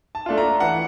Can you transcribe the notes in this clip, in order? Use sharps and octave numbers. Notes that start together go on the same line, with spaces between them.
A5
A3 D4 F4
A#5
E3 F#5